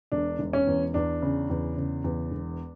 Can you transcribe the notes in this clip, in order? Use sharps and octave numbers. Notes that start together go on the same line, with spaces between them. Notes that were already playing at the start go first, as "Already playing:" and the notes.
E1 D4
E1
C#4
E2
E2 D4
C#3
E2
C#3
E2
E1